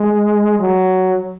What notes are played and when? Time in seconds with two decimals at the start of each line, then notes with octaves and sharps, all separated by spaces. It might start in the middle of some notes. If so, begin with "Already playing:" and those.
Already playing: G#3
0.59 F#3